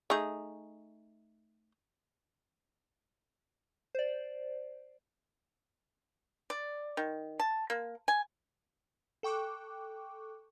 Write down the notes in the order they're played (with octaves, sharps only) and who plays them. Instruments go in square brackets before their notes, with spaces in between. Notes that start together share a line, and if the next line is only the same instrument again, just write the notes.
[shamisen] A3 D#4 G#4
[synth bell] C5 D5
[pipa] D5
D#3
A5
A#3
G#5
[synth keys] A4 G5 C#6 D6 F#6